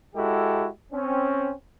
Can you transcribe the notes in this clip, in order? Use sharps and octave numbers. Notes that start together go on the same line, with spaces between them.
G#3 E4 F#4 G4 A4
C4 C#4